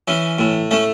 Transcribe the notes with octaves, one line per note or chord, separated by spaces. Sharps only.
E3 C#4
A2
A3 C#4